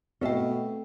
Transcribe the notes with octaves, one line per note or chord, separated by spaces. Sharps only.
B2 A3 C4 D#5 E5 G5